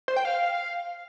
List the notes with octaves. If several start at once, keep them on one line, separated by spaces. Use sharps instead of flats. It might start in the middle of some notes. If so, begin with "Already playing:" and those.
C5
G5
F5